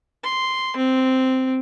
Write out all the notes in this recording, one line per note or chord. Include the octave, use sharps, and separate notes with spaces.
C6
C4